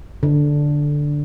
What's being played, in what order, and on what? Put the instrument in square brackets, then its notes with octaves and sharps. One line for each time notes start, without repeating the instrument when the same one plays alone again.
[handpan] D3